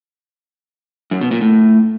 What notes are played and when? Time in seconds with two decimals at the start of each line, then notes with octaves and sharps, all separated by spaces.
1.11 F#2
1.21 B2
1.31 A#2
1.41 A2